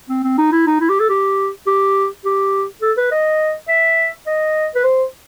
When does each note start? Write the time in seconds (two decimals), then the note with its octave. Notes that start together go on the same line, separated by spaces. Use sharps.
0.09 C4
0.24 C4
0.38 D#4
0.52 E4
0.67 D#4
0.81 E4
0.90 G4
1.00 A4
1.09 G4
1.67 G4
2.25 G4
2.82 A4
2.97 B4
3.12 D#5
3.69 E5
4.27 D#5
4.75 B4
4.84 C5